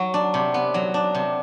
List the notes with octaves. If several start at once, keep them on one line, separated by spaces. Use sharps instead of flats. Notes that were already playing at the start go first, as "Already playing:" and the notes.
Already playing: F#3
D4
C3
B3
F#3
D4
C3